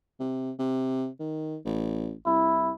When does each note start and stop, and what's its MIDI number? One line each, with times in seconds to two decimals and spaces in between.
0.20 0.51 48
0.59 1.08 48
1.20 1.56 51
1.65 2.14 33
2.26 2.71 36
2.26 2.72 64